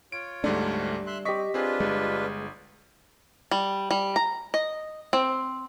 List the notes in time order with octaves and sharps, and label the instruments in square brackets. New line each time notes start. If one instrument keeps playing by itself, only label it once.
[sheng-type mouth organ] F4 C#5 [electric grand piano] D7
[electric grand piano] D2 G#2 A3 [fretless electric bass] G3 D4
[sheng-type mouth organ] E5 C6 F#6
[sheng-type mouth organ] C4 [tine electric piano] G4 D#5 [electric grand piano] C#6 B6
[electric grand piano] C4 G#4 [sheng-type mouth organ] D4 F4 B4
[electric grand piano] G1 [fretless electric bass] G#3
[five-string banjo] G3
G3
A#5
D#5
C4